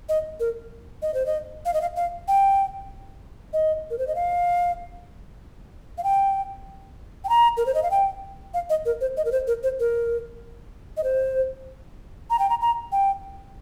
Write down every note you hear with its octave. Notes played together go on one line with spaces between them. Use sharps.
D#5
A#4
D#5
C5
D#5
F5
D#5
F5
F5
G5
D#5
A#4
C5
D#5
F5
F5
G5
G5
A#5
A#4
C5
D#5
F5
G5
F5
D#5
A#4
C5
D#5
A#4
C5
A#4
C5
A#4
D#5
C5
A#5
G5
A#5
A#5
G5